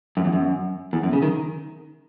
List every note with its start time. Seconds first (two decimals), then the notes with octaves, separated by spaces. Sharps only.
0.17 F#2
0.25 E2
0.33 F#2
0.93 E2
1.03 F#2
1.13 C#3
1.22 D#3